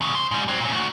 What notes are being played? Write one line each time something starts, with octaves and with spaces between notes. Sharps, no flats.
E2 C#3
C5
G#2 G3
F#3 C4
A#2 C#4
A3 F#4